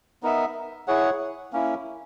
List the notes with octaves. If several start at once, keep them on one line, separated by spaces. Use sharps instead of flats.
B3 D#4 A#4 E5
E4 G#4 C#5 F#5
A#3 C#4 E4